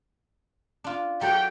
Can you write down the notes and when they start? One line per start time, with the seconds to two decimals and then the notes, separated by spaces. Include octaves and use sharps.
0.84 D4 F4
1.21 F#3 A4 F#5 G5